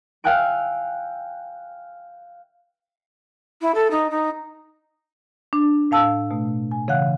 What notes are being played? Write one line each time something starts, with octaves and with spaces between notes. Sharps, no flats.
E5 F5 G5 G#5 F#6 D7
E4
A4
D#4
D#4
D4
A2 F5 A5 E6
B2 A3
G#5
C#3 E3 F5 F#5 F#6